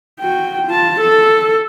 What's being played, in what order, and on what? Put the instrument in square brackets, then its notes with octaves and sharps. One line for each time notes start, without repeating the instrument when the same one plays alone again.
[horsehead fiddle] F#4 G5
F4 A5
A4